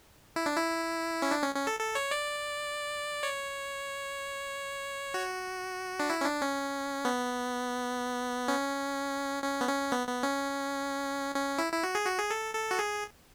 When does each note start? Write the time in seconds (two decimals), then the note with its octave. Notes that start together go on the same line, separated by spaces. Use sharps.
0.36 E4
0.46 D4
0.57 E4
1.22 C#4
1.31 D4
1.43 C#4
1.55 C#4
1.67 A4
1.79 A4
1.95 C#5
2.11 D5
3.23 C#5
5.14 F#4
6.00 D4
6.10 E4
6.21 C#4
6.25 D4
6.42 C#4
7.05 B3
8.48 C#4
9.44 C#4
9.61 B3
9.69 C#4
9.92 B3
10.07 B3
10.23 C#4
11.35 C#4
11.59 E4
11.72 E4
11.84 F#4
11.95 G#4
12.06 F#4
12.19 G#4
12.31 A4
12.55 A4
12.71 F#4
12.79 G#4